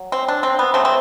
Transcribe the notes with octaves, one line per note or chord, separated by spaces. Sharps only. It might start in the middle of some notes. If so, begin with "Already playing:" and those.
Already playing: F#3
C4
D4
C4
B3
C#3 F#3 A3 C4
C4